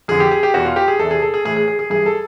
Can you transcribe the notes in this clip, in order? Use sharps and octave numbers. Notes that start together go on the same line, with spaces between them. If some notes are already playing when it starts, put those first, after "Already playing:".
F2 D3 G#4
G4
G#4
G4
E2 B2 F#4
F4
G4
G#4
E2 C3 E3 A4
G#4
A4
G#4
A2 E3 G#4
G#4
G#4
G#4
G2 E3 G#4
A4